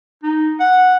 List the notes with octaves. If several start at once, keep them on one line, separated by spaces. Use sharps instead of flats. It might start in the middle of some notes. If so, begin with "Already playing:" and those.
D#4
F#5